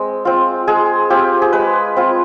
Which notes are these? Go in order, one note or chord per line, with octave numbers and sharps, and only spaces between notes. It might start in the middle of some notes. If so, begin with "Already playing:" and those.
Already playing: G#3 C4
C4 F4
G#3 G#4
C4 F4 G4
G#4
G#3 B4
C4 F4